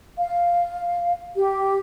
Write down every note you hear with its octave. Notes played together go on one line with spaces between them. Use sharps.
F5
G4